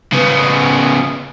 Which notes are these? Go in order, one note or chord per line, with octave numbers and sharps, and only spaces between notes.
C#3 B3